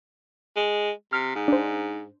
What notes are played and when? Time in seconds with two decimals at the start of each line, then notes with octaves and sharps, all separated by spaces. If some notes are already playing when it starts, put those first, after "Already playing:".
0.56 G#3
1.13 C3 F6
1.35 G#2
1.48 D4 C5